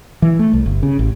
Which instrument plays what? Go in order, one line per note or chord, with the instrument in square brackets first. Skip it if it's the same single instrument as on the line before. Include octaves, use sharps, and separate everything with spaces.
[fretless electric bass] E3
A3
C2
G1
C#3
A1